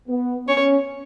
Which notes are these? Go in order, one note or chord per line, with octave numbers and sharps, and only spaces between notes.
B3
C#4 C#5